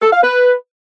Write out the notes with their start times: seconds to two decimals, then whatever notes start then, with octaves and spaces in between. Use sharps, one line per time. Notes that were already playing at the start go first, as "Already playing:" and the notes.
0.02 A4
0.13 F5
0.23 B4